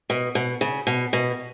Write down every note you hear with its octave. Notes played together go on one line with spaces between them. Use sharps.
B2
B2
C#3
B2
B2